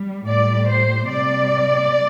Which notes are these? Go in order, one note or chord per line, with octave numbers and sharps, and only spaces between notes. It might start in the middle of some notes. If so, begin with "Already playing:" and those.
Already playing: G3
A2 G3 D5
C5
C3 G3 D5